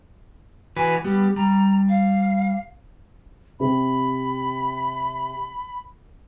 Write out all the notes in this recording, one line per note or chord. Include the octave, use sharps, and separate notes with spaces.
E3 F#4 B4 G#5
G3 B3 G4
G3 A#5
F5
C3 B5